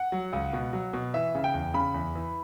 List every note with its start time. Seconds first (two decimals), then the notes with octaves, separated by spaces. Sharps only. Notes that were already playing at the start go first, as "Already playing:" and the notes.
Already playing: F#5
0.12 F#3
0.33 C#2
0.53 B2
0.73 F#3
0.93 B2
1.14 E3 E5
1.35 C#3
1.44 G5
1.54 E2
1.74 C#3 B5
1.94 E2
2.15 E3